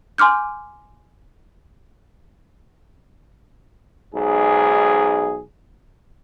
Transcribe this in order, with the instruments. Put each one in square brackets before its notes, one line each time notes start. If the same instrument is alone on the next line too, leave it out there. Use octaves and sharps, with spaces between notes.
[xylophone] G#5 C6 D6 F6 G6
[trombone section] B1 G#2 G#4